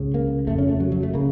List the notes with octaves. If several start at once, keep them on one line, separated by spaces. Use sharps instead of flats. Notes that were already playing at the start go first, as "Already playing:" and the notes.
Already playing: C#2 C#3
A#3
F2 C#3 A3
C#4
A3
F#3
F#3
A3
C#3 A#3